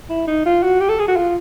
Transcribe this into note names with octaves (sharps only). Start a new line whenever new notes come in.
E4
D#4
F4
F#4
G4
A4
G#4
F#4
F4